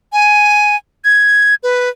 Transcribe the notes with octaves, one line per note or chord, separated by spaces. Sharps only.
G#5
G#6
B4